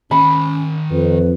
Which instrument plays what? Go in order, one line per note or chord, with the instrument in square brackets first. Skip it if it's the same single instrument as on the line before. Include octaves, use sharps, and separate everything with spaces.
[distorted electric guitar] D#3 G#5 [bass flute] C#4 [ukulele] B5
[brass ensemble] F2 [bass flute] B4